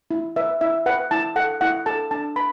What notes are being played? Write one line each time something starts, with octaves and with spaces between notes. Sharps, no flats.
E4
B4 E5
E4 E5
B4 F#5
E4 A5
A4 F#5
E4 F#5
A4 A5
D4 A5
B4 B5